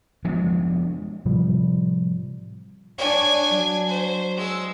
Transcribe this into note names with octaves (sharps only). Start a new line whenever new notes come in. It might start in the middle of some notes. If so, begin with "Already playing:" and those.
F3 G#3 B3 D4
A2 C3 F3 G3
D4 C#5 D5 G#5
F#3
C5
G#3 E6